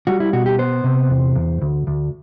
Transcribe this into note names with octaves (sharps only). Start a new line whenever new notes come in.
G3 F#4
E4
B2 F#4
G4
B3 C5
C3
E2
E2
D2
D2